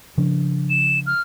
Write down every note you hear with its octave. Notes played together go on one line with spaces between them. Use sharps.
C#3 F3 D4
E7
F6